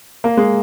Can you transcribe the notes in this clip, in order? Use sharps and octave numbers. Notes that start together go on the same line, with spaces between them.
A#3
G#3